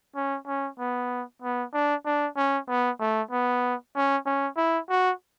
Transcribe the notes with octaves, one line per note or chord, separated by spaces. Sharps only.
C#4
C#4
B3
B3
D4
D4
C#4
B3
A3
B3
C#4
C#4
E4
F#4